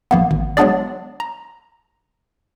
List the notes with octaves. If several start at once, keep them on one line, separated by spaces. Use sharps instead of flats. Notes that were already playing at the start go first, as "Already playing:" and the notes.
A#1 A#3 B3
G#1
F#3 G#3 B3 D4 G#4 D5
A#5